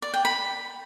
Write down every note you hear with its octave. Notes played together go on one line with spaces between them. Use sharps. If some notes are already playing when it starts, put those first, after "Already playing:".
D5
G5
B5